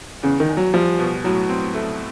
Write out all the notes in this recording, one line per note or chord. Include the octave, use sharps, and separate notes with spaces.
E2 C#3
D#3
E2
F#3
F3 G3
B2
A2 F#3
C4
A3